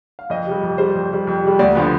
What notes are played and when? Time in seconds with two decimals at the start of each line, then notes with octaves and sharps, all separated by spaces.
0.19 F5
0.30 F2 D#5
0.47 C3 G3
0.63 F2
0.78 C3 G3 C5
0.95 F2
1.10 C3 G3
1.27 F2
1.44 C3 G3
1.59 D2 D5
1.75 D3 F3 B3